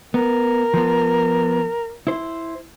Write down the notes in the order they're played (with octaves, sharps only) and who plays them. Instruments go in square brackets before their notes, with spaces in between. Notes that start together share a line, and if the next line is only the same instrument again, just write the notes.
[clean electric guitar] B3 [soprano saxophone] A#4
[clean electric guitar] F3 B3
E4 C5